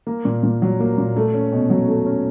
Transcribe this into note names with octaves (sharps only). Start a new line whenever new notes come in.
A#3
A#2
A#2
F#3
A#3
A#2
A3
C#4
B2
F#3
A3
C#4